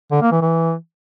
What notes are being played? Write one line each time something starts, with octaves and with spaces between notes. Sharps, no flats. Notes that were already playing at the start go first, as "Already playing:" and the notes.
D3
A#3
E3
E3